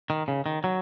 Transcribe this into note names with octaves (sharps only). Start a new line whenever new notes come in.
D#3
C#3
D#3
F#3